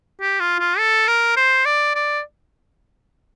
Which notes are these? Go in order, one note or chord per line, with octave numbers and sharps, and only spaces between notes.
G4
F4
F4
A4
A#4
C5
D5
D5